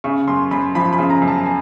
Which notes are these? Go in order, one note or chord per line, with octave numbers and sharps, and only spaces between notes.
C#3 C#6
F#2 C6
F#2 B5
F3 B5
B5
C#3
A#5
F#2
A5
G#5